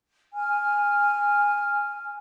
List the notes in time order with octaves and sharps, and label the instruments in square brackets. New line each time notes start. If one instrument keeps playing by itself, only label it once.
[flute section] G#5 F6